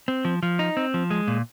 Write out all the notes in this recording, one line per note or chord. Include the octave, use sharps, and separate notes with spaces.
C4
F3
F3
D#4
C4
F3
G#3
A#2